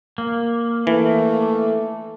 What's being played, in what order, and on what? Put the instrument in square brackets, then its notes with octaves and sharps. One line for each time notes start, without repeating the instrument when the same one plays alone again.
[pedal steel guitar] A#3
[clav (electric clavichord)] E3 [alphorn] A3